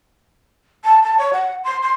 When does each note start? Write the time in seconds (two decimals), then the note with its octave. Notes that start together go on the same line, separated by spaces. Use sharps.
0.84 A5
1.03 A5
1.19 C#5
1.33 F#5
1.64 C6
1.82 C6